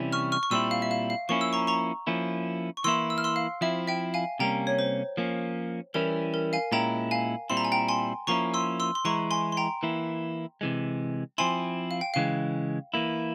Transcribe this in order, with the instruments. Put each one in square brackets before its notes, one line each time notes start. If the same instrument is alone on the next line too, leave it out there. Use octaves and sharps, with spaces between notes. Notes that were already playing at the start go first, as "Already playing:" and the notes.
Already playing: [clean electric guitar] C3 E3 G3 C#4 E4
[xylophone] C#6 F6
C#6 F6
C#6
[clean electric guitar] A#2 G3 C4 E4 [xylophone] C6 E6
[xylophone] F5
E5
F5
F5
[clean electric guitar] F3 A#3 C#4 E4 [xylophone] C#6
[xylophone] E6
A#5 C#6
A#5 C#6
[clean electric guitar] F3 A#3 C#4 E4
[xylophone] C#6
[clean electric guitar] E3 A#3 E4 [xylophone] C6 E6
[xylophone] E6
F6
C6 E6
F5
[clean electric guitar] F3 C4 E4 [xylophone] E5
[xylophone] E5 G5
F5 G#5
[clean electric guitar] C3 G3 A#3 C#4 [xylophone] G5 A#5
[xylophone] C#5
C5
[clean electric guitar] F3 A#3 C#4
[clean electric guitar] E3 G3 C#4 E4 [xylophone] A#4
[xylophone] A#4
F5 G#5
[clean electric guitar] A#2 G#3 C#4 E4 [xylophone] G5 A#5
[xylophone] F5 G#5
[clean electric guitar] A#2 G3 C4 E4 [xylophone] C6
[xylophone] A#5
G#5
G5 A#5
G#5 C6
[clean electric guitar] F3 A#3 C#4 E4 [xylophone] A#5 C#6
[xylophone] C6 E6
C6 E6
C6
[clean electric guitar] E3 G#3 E4 [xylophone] A#5 C#6
[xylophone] G#5 C6
C6
G5 A#5
[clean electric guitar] E3 A#3 E4
C3 E3 G#3
[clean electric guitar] F3 C4 E4 [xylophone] G#5 C6
[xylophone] F5
G5
[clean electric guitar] C#3 E3 G#3 [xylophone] F5
[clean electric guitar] E3 A#3 E4